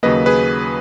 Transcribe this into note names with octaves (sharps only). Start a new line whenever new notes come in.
D#2 C#3 F#3 A#3 B4 D#5
G#4 B4